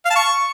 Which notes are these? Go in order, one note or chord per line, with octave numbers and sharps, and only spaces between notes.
F5
A5
C#6